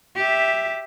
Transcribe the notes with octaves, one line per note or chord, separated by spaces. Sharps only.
G4 E5